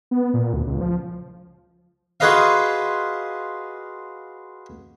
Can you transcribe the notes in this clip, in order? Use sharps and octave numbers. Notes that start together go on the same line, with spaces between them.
B3
A#2
D2
C#2
F3
F4 F#4 G#4 B4 D#5 F5